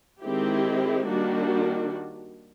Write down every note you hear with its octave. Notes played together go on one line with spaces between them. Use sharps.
D#3 G#3 C4 E4 G4
D#3 G3 A#3 D4 F#4